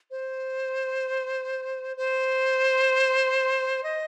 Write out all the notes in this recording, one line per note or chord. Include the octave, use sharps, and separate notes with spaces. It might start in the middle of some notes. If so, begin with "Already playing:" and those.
C5
C5
D#5